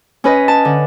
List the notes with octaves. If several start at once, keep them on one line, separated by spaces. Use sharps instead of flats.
C#4 B4 D#5
A5
D3